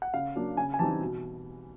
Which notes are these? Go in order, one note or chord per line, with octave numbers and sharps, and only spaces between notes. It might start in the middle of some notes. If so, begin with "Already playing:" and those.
F#5
C#3 F5
F#3 A#3 D4
C#3 G#5
G#5
E3 G3 C4 D#4 A5
B2